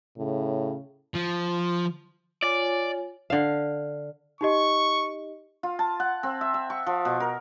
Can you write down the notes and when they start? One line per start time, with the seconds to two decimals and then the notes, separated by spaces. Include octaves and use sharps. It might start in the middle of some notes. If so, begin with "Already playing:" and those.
0.18 A2 C#3
1.15 F3
2.42 F4 C#5 D5 G#5
3.30 D3 F5
4.41 D#4 G4 D#5 C#6
5.63 F4
5.79 A5
6.00 F#5
6.23 C4
6.41 E5
6.54 E5
6.70 C#6
6.86 F3
7.05 B2
7.20 A#4